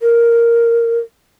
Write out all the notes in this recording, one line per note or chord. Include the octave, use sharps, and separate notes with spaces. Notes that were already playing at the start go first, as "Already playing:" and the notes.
A#4